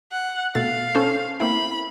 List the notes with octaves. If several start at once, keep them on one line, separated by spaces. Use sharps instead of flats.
F#5
B2 A3 F5 A6
C#4 A4 C5
A#3 C4 E4 B5